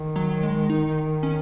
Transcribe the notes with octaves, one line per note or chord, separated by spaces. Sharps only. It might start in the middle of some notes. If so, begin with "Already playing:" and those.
Already playing: D#3
F#3
G#3
D#4
C#4